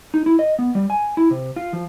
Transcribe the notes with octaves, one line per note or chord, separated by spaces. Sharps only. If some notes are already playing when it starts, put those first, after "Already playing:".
D#4
E4
D#5
B3
G3
G#5
E4
C3
F4
F3